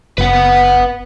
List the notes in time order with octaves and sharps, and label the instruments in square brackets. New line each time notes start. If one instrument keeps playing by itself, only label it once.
[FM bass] F#1 [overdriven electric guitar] B4 F#5